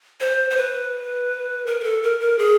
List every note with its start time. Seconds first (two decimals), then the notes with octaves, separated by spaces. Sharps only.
0.21 C5
0.50 C5
0.57 B4
1.66 A#4
1.80 A#4
1.84 A4
2.03 A#4
2.20 A#4
2.39 G#4